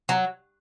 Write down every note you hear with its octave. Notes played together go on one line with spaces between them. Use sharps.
F#3